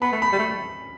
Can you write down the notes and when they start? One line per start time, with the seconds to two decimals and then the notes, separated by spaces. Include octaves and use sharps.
0.02 B3 B5
0.12 A3
0.22 B5
0.32 G3
0.39 A3